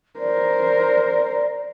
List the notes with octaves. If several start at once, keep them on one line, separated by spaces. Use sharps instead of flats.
A#4 C5 D5